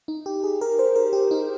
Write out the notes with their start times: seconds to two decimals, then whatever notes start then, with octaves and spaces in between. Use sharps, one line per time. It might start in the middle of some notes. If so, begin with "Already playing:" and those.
0.08 D#4
0.26 G4
0.44 G#4
0.61 A#4
0.79 C5
0.96 A#4
1.13 G4
1.31 D#4